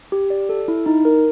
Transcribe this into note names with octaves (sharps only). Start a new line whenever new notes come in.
G4
D5
A4
E4
D#4
A#4